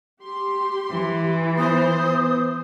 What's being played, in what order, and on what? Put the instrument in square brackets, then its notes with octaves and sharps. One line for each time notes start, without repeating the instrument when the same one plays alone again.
[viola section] G4 C6
[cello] E3
[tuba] B3 [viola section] C5 [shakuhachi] D#6